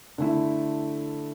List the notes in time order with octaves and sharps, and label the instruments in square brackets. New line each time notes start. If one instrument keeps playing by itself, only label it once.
[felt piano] D3 A3 E4